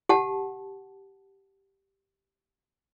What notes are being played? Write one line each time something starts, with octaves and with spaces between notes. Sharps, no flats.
G4 F#5 A5